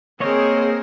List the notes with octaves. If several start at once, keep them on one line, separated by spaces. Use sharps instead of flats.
A#3 C4 G#4 A#4 C5 C#5 D#5